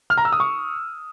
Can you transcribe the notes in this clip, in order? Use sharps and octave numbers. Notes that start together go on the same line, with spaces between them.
F6
A#5
E6
D#6
C#6